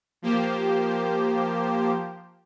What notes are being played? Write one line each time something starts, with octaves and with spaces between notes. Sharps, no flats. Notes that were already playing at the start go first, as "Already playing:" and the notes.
F3 A#3 G4 C5